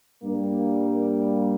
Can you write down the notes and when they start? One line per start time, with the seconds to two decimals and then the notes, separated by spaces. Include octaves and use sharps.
0.22 G2 G3 A#3